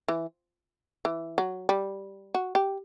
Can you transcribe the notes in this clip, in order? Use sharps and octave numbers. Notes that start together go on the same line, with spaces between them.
E3
E3
F#3
G3
F#4
G4